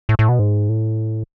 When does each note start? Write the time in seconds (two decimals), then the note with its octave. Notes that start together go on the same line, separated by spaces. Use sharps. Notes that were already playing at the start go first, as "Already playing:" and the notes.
0.09 A2
0.19 A2
0.29 B2
0.39 G#2
0.69 A2